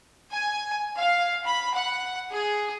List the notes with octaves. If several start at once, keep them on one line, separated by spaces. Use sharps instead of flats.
G#5
F5
B5
F#5
G#4